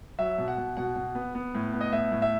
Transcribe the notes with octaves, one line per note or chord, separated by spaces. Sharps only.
F#3 E5
B2
F#5
B2
B2 F#5
B2
B3
B3
A2
B3
D#5
A2 E5
A2
E5